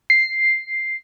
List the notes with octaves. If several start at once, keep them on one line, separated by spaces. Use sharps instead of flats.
C7